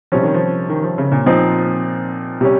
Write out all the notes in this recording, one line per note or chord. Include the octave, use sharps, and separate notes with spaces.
C3 F3 G3 C#4
D#3
F3
D#3
F3
C#3
A#2
A#2 F3 C4 D#4
C3 G3 C#4